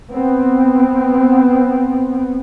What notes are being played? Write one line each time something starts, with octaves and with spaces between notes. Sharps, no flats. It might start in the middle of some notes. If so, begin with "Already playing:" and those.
B3 C4